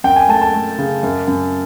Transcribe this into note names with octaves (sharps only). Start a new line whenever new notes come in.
F#2 G5
G#5
A3 A5
A5
A3
C#3
F#2
F#2